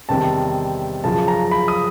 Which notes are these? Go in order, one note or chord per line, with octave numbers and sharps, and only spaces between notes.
E2 C3 D#3 G3 C4 A5
F#2 C#3 F3 A5
A#5
B5
D#6